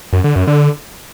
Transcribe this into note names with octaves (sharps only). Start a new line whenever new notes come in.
F#2
D3
F#2
D3